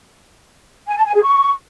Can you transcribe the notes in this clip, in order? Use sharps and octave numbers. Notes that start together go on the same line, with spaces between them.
G#5
A5
G#5
G#4
C#6